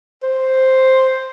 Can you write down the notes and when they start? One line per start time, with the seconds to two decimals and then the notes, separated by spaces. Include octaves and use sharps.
0.23 C5